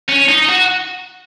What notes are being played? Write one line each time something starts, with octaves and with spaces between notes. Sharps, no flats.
C#4
D#4
F#4